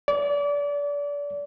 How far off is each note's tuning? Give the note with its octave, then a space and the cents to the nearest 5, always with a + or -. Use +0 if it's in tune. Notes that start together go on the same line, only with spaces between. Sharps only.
D5 -30